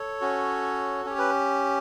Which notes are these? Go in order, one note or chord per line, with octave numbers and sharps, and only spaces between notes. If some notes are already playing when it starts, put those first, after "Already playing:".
Already playing: A4 C#5
C#4 F#4
C#4 G4 C#5
B4